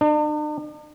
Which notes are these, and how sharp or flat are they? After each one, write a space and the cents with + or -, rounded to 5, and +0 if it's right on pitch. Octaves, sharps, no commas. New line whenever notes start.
D4 +45